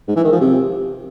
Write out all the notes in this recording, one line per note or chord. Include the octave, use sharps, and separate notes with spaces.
G#2
E3
D#3
F3
C3